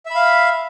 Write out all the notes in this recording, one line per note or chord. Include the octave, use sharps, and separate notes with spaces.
E5 F5 B5